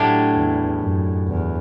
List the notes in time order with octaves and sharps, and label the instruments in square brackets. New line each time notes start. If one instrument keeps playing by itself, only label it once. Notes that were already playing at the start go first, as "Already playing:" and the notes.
Already playing: [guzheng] A2 F#3 A3 D4 G4
[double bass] E2
F#2
E2